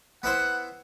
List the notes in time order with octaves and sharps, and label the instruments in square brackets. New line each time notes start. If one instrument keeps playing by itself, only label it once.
[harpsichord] B3 E4 C5 [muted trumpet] F#5